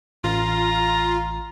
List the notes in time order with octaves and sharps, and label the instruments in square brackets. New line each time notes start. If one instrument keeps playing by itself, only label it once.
[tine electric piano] A1 [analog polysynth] F4 [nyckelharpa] A#5